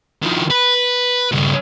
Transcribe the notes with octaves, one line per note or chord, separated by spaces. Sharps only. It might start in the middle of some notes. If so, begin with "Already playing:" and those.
D#3 F3
B4
G2 C#3